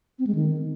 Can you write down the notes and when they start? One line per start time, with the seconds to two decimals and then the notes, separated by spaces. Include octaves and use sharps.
0.19 C4
0.27 G#3
0.35 D#3